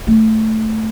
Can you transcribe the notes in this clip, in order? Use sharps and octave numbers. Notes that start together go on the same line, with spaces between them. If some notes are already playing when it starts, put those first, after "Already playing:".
A3